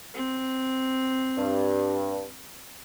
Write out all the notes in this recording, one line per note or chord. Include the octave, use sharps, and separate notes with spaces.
C4
G2